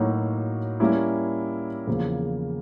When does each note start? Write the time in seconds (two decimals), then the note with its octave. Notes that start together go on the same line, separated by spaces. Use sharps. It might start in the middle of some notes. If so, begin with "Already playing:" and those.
Already playing: A2 F#3 A#3 D#4 F#4
0.80 G3 A#3 C#4 E4
1.87 E2 C#3 F3 A#3